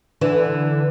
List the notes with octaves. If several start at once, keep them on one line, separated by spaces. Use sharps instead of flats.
D3 E3